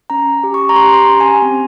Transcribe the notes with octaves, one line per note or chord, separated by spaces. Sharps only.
C#4 A#5
G4
C#6
A#5
G4 C6
C6
A#5
C#4
G#5
C4